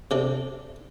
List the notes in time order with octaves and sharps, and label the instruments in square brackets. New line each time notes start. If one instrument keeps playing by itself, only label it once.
[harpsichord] C3 D4 A4